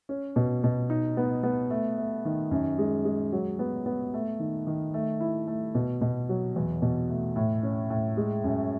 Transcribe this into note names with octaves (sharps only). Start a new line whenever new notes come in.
C#4
B2
B2
D#4
B3
B3
A3
A3
D#3
F#2
G#3
G#3
F#3
B3
B3
A3
D#3
D#3
A3
E4
A3
B2
B2
F#3
E2
B2
A3
A2
C#4
A2
G#3
F#2